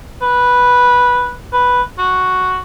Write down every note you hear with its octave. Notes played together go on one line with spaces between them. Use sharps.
B4
B4
F#4